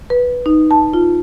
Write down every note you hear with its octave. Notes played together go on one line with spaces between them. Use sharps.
B4
D#4
A5
F4